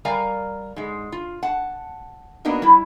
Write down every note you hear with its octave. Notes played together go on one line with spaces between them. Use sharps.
G3 A#4 D5 F5 G#5 A#5
G#2 G#3
F4
F#5 A5
A#3 B3 D4 D#4 F#4 A#4
G3 E4